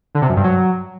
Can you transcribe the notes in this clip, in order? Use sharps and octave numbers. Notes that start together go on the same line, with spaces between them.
D3
C3
F#2
G2
F#3